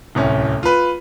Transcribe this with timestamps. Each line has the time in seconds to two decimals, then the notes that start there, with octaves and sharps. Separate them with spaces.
0.15 D1 C2 C#4
0.63 F4 B4